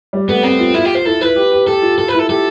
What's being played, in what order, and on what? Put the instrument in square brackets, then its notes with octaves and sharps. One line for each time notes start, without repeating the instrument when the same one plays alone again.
[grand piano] G3
[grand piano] A3 [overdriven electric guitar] B3
[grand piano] B3 [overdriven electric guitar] C4
[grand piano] F4
[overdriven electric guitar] E4 [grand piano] F4
[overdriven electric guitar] G4
C5
[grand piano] E4 [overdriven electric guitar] A4
[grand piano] E4 [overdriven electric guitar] B4
[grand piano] G4
G4
[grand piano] G4 [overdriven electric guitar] A4
[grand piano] F4
[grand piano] F4 [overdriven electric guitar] A4
[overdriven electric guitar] B4
[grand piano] E4
[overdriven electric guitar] A4
[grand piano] G4 [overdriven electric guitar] A4